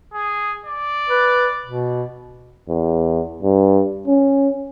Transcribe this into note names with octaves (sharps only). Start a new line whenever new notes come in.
G#4
D5
B4
B2
E2
G2
C#4